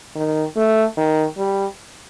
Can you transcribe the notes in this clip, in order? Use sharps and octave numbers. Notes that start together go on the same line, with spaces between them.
D#3
A3
D#3
G3